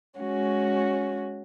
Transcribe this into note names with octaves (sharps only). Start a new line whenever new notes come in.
G#3 C#4 F#4